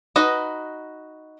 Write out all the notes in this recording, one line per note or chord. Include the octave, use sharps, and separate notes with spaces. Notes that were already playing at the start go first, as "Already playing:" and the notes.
D#4 F#4 B4 D#5 F#5